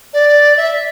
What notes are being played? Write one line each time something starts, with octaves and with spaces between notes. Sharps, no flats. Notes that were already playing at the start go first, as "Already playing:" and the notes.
D5
E5